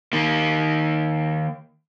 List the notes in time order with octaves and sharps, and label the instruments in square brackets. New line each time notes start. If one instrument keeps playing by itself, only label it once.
[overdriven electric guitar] D#3 A#3